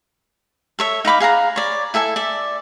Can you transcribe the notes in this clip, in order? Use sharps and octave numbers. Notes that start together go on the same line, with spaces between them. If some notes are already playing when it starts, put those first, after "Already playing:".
A4 C#5 E5
D#4 F5 B5 D6
G#4 F5 F#5 A#5
C#5 D5
E4 A4 E5 G#5
D5 E5